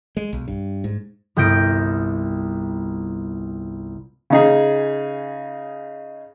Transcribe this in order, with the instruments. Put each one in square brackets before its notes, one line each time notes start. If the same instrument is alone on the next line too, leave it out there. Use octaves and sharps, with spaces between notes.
[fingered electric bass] G#3
B1
G2
G#2
[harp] G1 C2 G5 G6 A#6 D7
[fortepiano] C#3 D#4 G#4